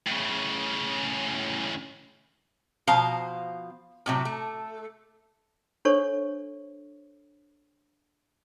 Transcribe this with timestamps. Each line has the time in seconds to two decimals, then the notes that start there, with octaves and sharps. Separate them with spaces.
0.07 A2 C#3
2.87 B2 F3 C5 F5 A#5
4.06 A2 C3 F#3
4.25 A3
5.85 D4 A4 C5 C#5 C#6